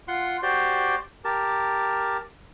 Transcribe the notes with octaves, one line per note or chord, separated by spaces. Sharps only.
F4 F#5 C6
F#4 G4 C5 D5 C6
G4 A#4 A5